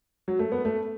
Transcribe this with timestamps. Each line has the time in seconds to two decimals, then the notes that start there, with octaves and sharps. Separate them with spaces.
0.28 F#3
0.39 A3
0.52 B3
0.65 A3